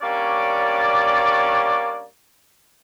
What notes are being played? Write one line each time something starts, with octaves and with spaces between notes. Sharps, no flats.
G3 A#3 C#4 D4 C#5 D5